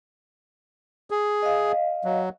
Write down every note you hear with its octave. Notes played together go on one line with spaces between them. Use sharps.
G#4
D#5 F5
F#3